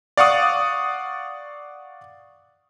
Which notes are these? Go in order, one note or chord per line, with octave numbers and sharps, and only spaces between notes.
D5 F5 F#5 C#6 D#6